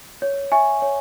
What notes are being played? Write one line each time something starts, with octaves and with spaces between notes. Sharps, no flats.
C#5
E5 G#5 C#6
C#5